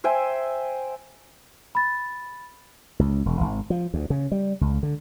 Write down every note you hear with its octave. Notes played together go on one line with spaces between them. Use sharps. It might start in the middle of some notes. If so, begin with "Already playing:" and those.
C5 E5 G5 G#5
B5 A6
C#2
E1
G#1
F3
D2
C#3
G3
C#2
D3